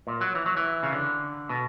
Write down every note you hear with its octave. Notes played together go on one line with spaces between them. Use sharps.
A#2
F#3
E3
F#3
E3
C#3
D3
B2